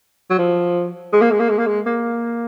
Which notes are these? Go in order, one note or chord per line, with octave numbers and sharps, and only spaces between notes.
F#3
F3
G#3
A#3
G#3
A#3
G#3
A#3
G#3
A#3